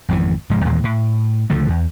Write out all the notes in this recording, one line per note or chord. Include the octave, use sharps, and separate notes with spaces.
G#1 F2 C3 E3
F1 G#2 F3 G#3
D#2 A#2 E3 G#3
A2
C#2 D3 F3 A3
E2